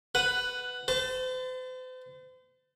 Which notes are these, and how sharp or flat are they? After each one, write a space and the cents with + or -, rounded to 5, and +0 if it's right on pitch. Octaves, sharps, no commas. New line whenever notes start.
B4 +10 F#5 +0
C5 -40 A5 +10